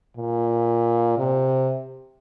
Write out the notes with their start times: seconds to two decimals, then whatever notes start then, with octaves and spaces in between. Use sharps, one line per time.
0.17 A#2
1.18 C3